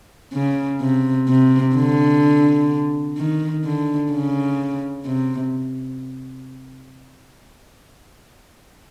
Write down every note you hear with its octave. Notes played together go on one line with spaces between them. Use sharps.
C#3
C3
C3
D3
D#3
D3
C#3
C3